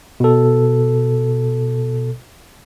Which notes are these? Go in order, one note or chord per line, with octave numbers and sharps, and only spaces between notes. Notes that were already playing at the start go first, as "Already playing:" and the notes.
B2 A4